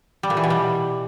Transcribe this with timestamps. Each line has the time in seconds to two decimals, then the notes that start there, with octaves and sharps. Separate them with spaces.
0.23 G3
0.30 A#2
0.37 E3
0.44 B2
0.50 G3